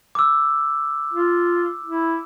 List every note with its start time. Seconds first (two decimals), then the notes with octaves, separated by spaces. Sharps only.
0.15 D6 E6
1.13 F4
1.84 E4